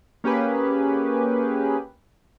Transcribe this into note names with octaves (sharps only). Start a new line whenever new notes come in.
A#3 C#4 G4 G#4 B4